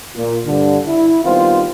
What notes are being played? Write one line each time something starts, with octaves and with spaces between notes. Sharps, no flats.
A#2
G2 D3
E4
D#3 G3 B3 C4 F4 C5